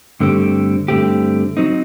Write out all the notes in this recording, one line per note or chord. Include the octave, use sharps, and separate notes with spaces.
G2 D3 A3 C4 G4
G2 D3 A3 C4 G4
F#3 C4 D#4